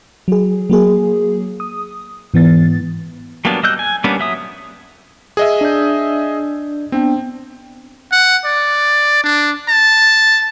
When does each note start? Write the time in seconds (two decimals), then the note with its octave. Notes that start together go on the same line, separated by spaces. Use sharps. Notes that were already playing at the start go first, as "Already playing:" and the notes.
0.28 F#3 G#4
0.70 F#3 A#3 G#4
1.60 D#6
2.34 G#2 E3 B3 A6
3.45 F#3 G3 A#3 B3 D4
3.63 G3 D#5 E6 F#6 G6
3.79 G#5
4.04 G3 A#3 B3 C#4 D4
4.19 F#3 E5 D#6
5.37 G#4 D#5 E5
5.61 D4 D5 G6
6.92 B3 C4 D4 G5
8.12 F#5
8.45 D5
9.24 D4
9.69 A5